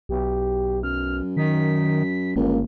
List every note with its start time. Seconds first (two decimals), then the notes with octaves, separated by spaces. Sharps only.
0.09 B1 G4
0.83 F#2 F6
1.37 D#3 B6
2.36 G1 C#2 A#3